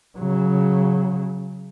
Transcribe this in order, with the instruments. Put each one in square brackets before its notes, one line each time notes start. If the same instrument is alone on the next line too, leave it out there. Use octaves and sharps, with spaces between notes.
[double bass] C#3 F#3